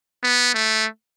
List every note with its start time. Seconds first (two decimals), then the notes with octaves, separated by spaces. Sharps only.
0.24 B3
0.54 A3